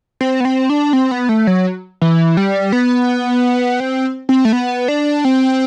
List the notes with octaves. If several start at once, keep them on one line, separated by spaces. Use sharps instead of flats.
C4
B3
C4
D4
C4
B3
A3
F#3
E3
G3
B3
C4
C4
A3
B3
D4
C4